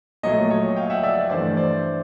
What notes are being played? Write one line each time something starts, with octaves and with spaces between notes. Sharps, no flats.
A#2 F#3 A3 C#5 D#5
C#5 D#5
F5 G5
E5 F#5
D5 E5
G2 E3 A3 C5 D5
C5 D5